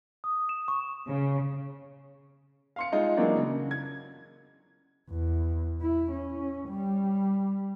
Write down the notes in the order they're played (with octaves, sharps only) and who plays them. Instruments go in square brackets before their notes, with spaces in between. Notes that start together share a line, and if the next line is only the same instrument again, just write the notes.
[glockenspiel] D#6
E7
C#6
[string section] C#3
[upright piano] F5 C6 C#7
G#3 D#4 F4
E3 F#3 G#3 A#3 D4 D#4
C#3
G#6
[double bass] E2
E4
C#4
G3